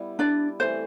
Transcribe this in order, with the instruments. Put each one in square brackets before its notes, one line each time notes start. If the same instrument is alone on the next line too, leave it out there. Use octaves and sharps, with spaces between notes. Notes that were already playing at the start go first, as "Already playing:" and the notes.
Already playing: [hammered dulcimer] G3 B3 E4
[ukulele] D4 D5
[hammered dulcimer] E3 A3 C4 [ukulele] C5